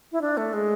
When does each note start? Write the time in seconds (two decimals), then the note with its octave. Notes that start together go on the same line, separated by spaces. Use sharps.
0.12 E4
0.21 D4
0.37 A3
0.53 G#3